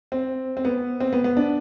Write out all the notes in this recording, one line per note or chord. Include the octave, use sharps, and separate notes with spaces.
C4
C4
B3
C4
B3
B3
D4